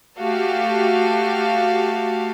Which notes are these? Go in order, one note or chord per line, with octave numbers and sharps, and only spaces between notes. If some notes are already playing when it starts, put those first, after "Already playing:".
A3 F#4 G4 F5 A5